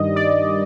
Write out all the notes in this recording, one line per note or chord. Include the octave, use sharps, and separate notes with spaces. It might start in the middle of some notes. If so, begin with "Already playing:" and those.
Already playing: G2 D#3 G3 D#5
D5